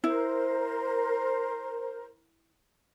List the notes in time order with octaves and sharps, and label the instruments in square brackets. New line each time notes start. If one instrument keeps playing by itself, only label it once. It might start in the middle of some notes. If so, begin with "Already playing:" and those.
[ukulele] E4 [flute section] A#4 C5